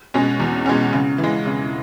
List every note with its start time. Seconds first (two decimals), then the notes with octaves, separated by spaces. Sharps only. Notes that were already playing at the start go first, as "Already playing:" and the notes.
0.14 B2 G#3 C#4
0.40 E2
0.66 B2 G#3 C#4
0.93 C#3
1.18 E3
1.24 G#3
1.46 C#3